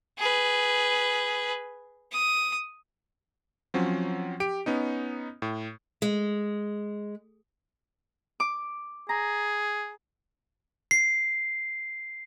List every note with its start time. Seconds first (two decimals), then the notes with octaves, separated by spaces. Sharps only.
0.18 G#4 B4
2.12 D#6
3.74 F3 F#3 C4 C#4
4.40 G4 D7
4.66 B3 C#4 D#4
5.42 A2
6.02 G#3
8.40 D6
9.09 G#4 A#5
10.91 C7